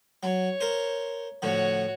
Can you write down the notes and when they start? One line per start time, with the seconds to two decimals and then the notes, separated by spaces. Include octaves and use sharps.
0.23 F#3 C#5
0.61 A#4 C5
1.42 A2 D3 F3 F#4 C#5